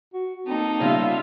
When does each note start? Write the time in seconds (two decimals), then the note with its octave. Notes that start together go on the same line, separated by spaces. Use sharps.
0.14 F#4
0.47 A#3 C4 D#4 A4
0.80 C#3 G3 B3 F4 E5